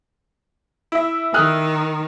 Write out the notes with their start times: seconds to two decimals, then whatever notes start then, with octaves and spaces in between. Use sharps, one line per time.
0.92 E4 E5
1.34 D#3 D#6 F6 F#6